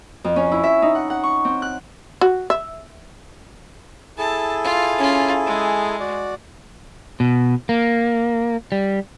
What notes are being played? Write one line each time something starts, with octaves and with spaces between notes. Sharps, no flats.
F2
C#4
E4
E5
D#4
F#5
F#5
C#6
C4
F#6
F#4
E5
E4 G#4 A4 A5
F4
C#4 F4
G#3
F#4 D5
B2
A#3
G3